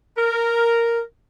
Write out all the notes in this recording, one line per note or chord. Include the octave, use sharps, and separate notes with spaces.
A#4